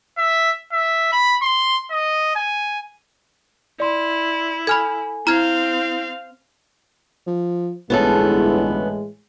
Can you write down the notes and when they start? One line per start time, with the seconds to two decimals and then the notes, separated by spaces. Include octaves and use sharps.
0.18 E5
0.72 E5
1.12 B5
1.42 C6
1.91 D#5
2.35 G#5
3.80 E4 D5 C6
4.67 A4 G#5 B5 F6 G#6
5.27 C4 E4 F5 A#5 F6 G#6
7.27 F3
7.90 G1 A2 E3 G#3 B3 C#4 A4